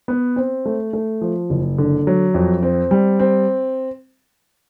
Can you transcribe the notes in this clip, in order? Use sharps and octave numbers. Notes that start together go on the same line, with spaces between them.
B3
C4
A3
A3
F3
F#1
D3
F#3
F2
C4
G3
C4